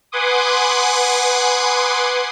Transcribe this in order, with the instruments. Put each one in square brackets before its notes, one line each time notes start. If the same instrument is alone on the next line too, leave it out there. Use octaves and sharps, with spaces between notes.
[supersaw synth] B4 F#5 G#5 C6 D6 D#6